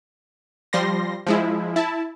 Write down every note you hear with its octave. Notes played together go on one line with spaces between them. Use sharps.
F3 G3 C6 A#6
F3 G#3 E4
E4 A5